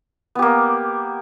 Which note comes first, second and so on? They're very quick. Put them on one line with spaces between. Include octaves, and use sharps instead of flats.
B3 G4 A#3